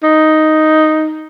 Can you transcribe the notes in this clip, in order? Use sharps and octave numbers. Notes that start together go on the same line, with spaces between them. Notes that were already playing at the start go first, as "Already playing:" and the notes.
D#4